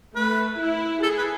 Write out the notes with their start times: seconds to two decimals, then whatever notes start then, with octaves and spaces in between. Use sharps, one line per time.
0.15 A3 B4
0.59 E4
1.03 G#4 A4
1.18 B4